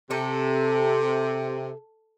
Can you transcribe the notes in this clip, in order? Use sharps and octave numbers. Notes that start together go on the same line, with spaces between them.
C3 A4